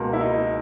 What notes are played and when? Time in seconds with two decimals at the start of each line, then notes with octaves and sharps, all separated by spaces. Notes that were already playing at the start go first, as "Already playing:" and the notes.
Already playing: C#2 B2 A#3
0.13 E4
0.21 D#4